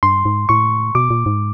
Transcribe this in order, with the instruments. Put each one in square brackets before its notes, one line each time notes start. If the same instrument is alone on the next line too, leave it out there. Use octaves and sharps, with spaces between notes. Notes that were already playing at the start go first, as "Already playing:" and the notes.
[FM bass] G2 [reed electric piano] C6
[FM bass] G#2
[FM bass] A2 [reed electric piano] C#6
[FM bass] B2 [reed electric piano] D6
[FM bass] A#2
G#2